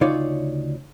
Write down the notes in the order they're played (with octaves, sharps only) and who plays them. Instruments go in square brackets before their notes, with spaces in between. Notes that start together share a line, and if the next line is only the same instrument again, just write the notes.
[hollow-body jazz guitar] D2 C#3 D#4 F4 C#5 D5